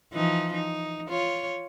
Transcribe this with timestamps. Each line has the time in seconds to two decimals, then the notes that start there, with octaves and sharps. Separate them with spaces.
0.13 E3 F3 D#4
0.53 D#4
1.08 F4 C#5